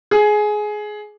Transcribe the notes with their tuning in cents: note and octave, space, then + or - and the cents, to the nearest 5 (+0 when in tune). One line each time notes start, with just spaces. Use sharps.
G#4 +15